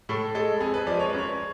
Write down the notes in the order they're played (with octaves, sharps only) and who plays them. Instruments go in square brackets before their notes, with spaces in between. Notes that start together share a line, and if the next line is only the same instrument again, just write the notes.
[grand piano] A2 A4
G#3 A4
F2 G#4
B4
F3 D5
G#3
C#5
F#2 B4
C#5